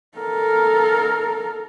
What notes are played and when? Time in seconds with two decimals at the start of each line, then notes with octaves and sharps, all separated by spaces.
0.18 A4 A#4